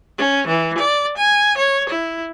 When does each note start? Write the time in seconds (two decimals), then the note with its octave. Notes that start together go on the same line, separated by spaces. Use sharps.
0.18 C#4
0.47 E3
0.78 D5
1.18 G#5
1.58 C#5
1.89 E4